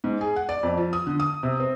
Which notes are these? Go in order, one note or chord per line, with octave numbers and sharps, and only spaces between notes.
G#2
G#4
F#5
D5
F2
F3
D#6
D3
D#6
C3
C4